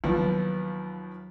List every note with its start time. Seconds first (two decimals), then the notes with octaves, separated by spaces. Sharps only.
0.04 D#2 F3 F#3 B3 E4